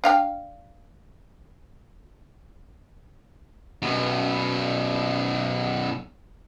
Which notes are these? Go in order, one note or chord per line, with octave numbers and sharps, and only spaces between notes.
D4 F5 G5
F#2 B2